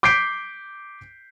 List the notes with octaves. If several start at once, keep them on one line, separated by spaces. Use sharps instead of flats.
D6 G6 B6 C7 D7